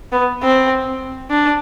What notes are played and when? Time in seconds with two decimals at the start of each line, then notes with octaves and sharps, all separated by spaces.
0.12 B3
0.42 C4
1.30 D4